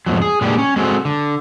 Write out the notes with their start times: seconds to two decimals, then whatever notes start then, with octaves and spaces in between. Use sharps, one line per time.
0.06 F2 G#2 B2 F3 F#3
0.22 G#4
0.41 A#2 G#3 D4 G4 B4
0.58 C#4
0.76 G#3 C4 F#4 G#4 A4
1.05 D3